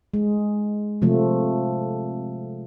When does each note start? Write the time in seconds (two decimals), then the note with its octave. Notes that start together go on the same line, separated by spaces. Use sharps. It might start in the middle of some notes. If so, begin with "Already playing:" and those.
0.14 G#3
1.02 C3 F3 A3